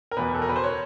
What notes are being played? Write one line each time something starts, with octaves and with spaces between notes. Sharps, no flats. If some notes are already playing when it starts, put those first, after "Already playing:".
A#4
E2 B2 B4
A4
A#4
B4
C5
C#5